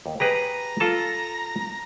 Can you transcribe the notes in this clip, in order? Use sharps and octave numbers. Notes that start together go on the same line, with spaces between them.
D#2
G4 G#4 B4 A#5
F4 A4 A5